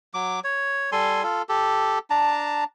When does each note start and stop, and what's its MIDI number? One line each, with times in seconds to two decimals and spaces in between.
0.14 0.40 54
0.14 0.40 86
0.44 0.90 73
0.92 1.23 55
0.92 1.23 69
0.92 1.23 80
0.92 1.23 84
1.23 1.42 65
1.23 1.42 69
1.49 1.99 67
1.49 1.99 69
2.10 2.64 62
2.10 2.64 81
2.10 2.64 82